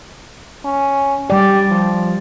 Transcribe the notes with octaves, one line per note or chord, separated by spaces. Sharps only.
C#4
G3 G4 D5
F3